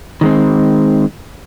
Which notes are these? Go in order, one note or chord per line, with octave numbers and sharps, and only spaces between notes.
D#3 G#3 C4